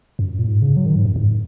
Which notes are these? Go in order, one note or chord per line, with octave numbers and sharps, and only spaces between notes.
F#2
A#2
G#2
C#3
F#3
D#3
G#2
F#2
G#2